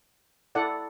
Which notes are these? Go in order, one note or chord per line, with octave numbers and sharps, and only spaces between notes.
E4 A4 D5 F#5